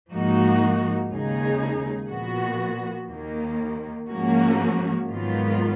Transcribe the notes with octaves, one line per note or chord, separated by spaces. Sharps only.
G#2 F3 A#3 D#4 F#4
D#2 C#3 G#3 D#4 G#4
A#2 F3 B3 F#4
D#2 D#3 A#3
G#2 F3 A#3 C#4 F#4
G#2 D#3 F#3 B3 F4